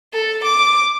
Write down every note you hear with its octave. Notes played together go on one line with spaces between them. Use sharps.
A4
D6